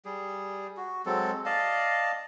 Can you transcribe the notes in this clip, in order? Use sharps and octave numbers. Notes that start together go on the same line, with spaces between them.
G3 G#4
F#4
F#3 G#3 C4 A4
D5 D#5 F5 A5